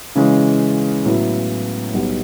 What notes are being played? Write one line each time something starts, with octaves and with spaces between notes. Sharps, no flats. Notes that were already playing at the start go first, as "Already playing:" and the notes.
C#3 E3 G#3 C#4
A2 F#3 B3 E4
B1 B2 G3 B3